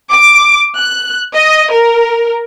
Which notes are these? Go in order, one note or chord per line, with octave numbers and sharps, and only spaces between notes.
D6
F#6
D#5
A#4